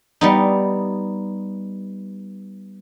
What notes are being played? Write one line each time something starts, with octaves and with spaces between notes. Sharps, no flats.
G3 B3 D#4